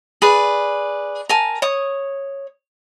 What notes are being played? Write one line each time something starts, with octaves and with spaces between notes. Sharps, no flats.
G#4 B4 D5
A#4 G#5 A5
C#5 D#6